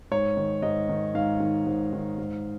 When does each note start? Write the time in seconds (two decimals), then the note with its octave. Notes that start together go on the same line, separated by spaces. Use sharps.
0.11 G#2 C#5
0.37 D#3
0.62 G#2 D#5
0.89 D#3
1.15 G#2 F5
1.40 D#3
1.67 G#2
1.93 D#3
2.18 G#2